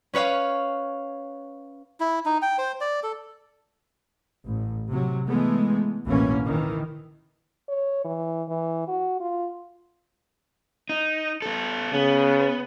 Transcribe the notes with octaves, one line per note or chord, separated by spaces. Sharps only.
C#4 B4 C#5 F5
E4
D#4
G5
C5
D5
A4
A1
C3 F#3
E3 G#3 A3 B3
A1 D2 B2 E3 A#3 C#4
D#3 E3
C#5
E3
E3
F#4
F4
D#4
B3 A4
C#3 B3